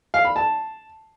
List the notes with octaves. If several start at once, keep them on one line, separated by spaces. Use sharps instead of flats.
F5
B5
A5